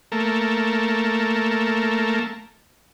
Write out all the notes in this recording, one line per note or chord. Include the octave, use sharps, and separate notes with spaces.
A3 A#3